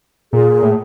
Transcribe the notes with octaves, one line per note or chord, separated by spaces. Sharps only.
A#2 G#4
A2